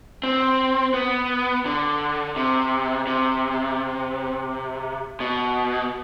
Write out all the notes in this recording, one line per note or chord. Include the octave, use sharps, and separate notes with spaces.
C4
B3
D3
C3
C3
B2